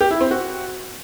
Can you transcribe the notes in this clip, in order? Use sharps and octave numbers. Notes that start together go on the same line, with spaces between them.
G4
E4
C4
F#4